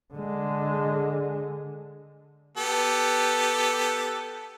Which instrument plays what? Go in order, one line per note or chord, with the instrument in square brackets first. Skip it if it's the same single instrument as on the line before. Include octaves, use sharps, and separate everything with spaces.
[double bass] D3 G#3
[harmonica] B3 G4 A4